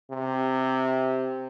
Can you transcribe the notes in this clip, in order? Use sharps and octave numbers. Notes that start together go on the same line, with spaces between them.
C3